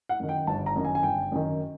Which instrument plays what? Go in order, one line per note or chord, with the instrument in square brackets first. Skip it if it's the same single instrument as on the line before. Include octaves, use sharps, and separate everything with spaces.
[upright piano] F#5
F#2 D#3
G5
G1 A5
A#5
F#2 D#3
G#5
G#5
G1 G5
F#2 D#3